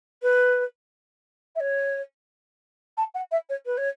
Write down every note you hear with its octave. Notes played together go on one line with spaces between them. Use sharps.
B4
E5
C#5
A5
F#5
E5
C#5
B4
C#5